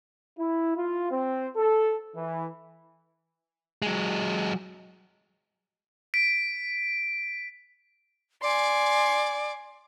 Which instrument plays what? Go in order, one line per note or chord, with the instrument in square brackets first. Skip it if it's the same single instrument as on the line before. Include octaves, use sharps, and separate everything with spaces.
[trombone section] E4
F4
C4
A4
E3
[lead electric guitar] F#3 G#3
[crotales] B6 D7
[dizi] D5 [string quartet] G#5 C6